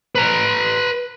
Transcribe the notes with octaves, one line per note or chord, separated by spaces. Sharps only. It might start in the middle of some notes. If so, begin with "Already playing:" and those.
B4 A#5